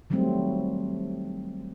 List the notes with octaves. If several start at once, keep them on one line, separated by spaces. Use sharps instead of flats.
D#3 F#3 G3 A3 C4